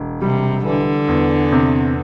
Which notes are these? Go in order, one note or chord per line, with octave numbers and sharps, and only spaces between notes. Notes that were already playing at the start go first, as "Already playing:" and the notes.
Already playing: E1
C3 G3
D3 E3
E2
C3